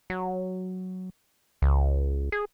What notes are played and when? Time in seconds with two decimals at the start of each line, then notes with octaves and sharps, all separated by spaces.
0.10 F#3
1.62 C#2
2.32 G#4